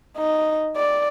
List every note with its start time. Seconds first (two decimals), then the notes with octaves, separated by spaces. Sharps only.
0.18 D#4
0.77 D5